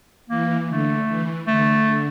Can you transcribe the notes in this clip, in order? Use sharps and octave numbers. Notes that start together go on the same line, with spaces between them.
E3 A#3
D3 A3
E3
D3 A3